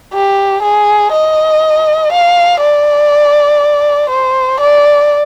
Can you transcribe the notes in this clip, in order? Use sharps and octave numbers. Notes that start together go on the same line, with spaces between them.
G4
G#4
D#5
F5
D5
C5
D5